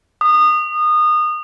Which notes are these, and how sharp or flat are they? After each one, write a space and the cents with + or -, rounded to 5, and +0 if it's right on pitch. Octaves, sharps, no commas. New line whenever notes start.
D#6 -25